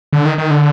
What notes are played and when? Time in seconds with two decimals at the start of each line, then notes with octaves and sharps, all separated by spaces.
0.13 D3
0.25 D#3
0.38 D#3
0.51 D3